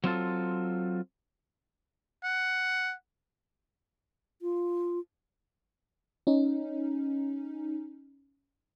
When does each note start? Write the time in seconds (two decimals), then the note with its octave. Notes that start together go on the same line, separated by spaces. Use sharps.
0.04 F#3 C4 F4 A4
2.24 F#5
4.42 F4
6.27 C#4 D#4